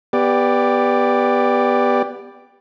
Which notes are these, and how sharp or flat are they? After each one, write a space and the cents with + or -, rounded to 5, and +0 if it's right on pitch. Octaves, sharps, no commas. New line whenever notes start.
B3 +0 G4 +20 D5 +0